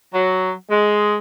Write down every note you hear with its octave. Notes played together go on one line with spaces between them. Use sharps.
F#3
G#3